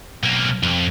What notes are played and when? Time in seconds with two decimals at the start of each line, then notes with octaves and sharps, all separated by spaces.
0.23 B1 A#3
0.63 F2